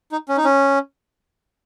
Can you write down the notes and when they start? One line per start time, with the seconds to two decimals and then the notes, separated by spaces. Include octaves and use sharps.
0.12 D#4
0.29 C#4
0.37 D#4
0.44 C#4